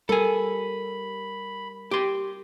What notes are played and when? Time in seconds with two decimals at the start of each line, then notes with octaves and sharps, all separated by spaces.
0.09 G3 A4 A#4 G#5 B5
1.91 G4 C6